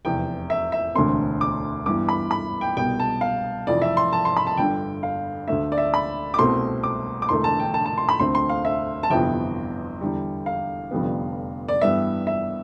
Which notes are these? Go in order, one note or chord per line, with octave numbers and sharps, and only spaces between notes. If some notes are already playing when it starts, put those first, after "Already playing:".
F1 E2 C3 G5
E5
E5
E1 D2 D3 A3 C4 C6
D6
G2 E3 B3 D6
B5
B5
G5
C2 B2 G3 B3 G5
A5
F5
F1 F2 E3 D5
E5
C6
A5
C6
B5
A5
G1 G2 D3 G5
F5
D2 D3 A3 E5
D5
E5
B5
D6
C2 B2 A3 C4 C6
D6
D6
E1 E2 D3 A3 C6
A5
G5
A5
A5
C6
B5
D2 D3 A3 C4 C6
C6
F5
E5
A5
G1 F2 C3 E3 B3 G5
E2 D3 G3
F5
F1 F2 D3 G3 B3
D5
G2 E3 G3 B3 E5
E5